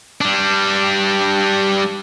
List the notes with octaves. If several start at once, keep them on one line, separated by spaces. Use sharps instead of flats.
G3 D4